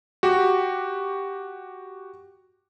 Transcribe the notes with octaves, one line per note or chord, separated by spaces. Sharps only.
F#4 G4